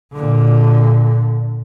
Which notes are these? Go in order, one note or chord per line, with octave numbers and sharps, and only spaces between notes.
A#2 D3